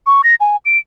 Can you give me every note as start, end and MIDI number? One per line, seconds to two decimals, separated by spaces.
0.07 0.22 85
0.24 0.35 94
0.41 0.56 80
0.65 0.78 98